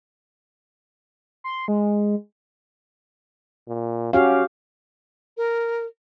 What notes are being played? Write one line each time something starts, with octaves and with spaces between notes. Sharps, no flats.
C6
G#3
A#2
C#4 F#4 G4 F5
A#4